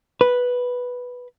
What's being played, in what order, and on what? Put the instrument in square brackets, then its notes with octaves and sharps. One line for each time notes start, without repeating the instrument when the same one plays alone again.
[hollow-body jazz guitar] B4